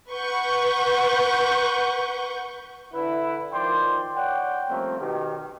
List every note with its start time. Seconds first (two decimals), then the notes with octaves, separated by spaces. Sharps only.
0.12 B4 F#5 C#6 G6
2.93 D3 E4 B4
3.53 D#3 F3 D5 G5 C6
4.16 C#5 D5 F#5 G5
4.69 F3 G3 A3 A#3 C4 C#4
4.99 B2 D#3 G4